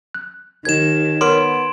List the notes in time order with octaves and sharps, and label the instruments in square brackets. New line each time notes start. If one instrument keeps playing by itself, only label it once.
[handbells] F#6
[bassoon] D#2 [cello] D#3 [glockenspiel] G#6 E7
[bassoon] B3 [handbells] A#4 C#5 D6 [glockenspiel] C6 D7